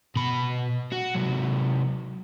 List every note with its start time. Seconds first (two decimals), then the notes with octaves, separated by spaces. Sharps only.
0.16 B2 B5
0.92 F#4
1.15 C3 F#3